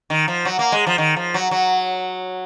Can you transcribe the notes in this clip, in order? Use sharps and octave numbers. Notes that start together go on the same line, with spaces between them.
D#3
F3
F#3
A#3
G#3
F3
D#3
F3
F#3
F#3